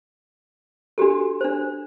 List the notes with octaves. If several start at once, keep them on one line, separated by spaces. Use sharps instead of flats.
D4 F#4 G4 A4
D4 C5